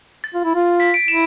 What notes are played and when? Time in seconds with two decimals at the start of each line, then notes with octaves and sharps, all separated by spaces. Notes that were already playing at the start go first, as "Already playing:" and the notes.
0.24 A6
0.34 F4
0.44 E4
0.55 F4
0.80 B6
0.94 D7
1.08 E4 E7